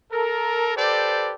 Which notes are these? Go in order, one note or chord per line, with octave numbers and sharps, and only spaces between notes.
A4 A#4
G4 A4 B4 C5 D5